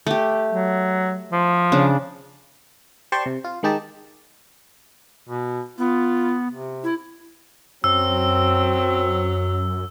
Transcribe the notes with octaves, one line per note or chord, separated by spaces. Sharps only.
A3 G4
F#3
F3
C#3 D4
G4 C5 D5 A5 C6 C#6
C3
F4
D#3 G#3 D#4 G4 A5
B2
B3 F4
C3
E4
F#2 F#3 C4 E6